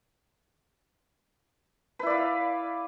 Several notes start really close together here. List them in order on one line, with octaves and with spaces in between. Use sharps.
B4 E4 D5 F5